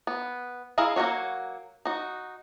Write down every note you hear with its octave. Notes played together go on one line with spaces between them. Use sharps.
B3
E4 G#4 D#5 F5 A#5
F#3 A#3 E4 F#4 C#5
D#4 F#4